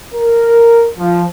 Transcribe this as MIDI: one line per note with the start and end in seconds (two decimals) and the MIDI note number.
0.14 0.89 70
0.98 1.24 53